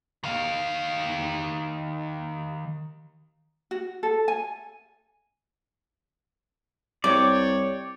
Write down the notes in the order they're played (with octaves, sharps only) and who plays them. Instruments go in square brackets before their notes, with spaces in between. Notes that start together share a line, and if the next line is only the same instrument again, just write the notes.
[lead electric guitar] D#3 F5
[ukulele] F#4
A4
G#5
[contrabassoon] C2 [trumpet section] C#5 [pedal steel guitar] D5 G5 [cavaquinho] D6